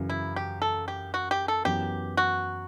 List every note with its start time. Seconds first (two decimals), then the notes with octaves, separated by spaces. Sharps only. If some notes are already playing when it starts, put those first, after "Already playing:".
Already playing: F#2 C#3 E3
0.09 E4
0.36 G4
0.62 A4
0.88 G4
1.14 F#4
1.31 G4
1.48 A4
1.65 F#2 E3 B3 G4
2.17 F#4